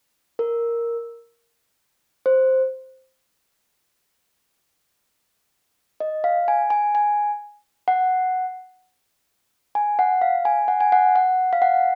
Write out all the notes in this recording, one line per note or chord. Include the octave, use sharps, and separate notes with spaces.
A#4
C5
D#5
F5
G#5
G#5
G#5
F#5
G#5
F#5
F5
G#5
F#5
G#5
F#5
F#5
F5
F#5